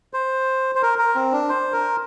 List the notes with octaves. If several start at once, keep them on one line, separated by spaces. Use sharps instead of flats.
C5
C5
A#4
A#4
C4
D4
C5
A#4